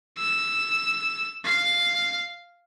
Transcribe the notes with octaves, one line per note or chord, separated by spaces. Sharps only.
E6
F5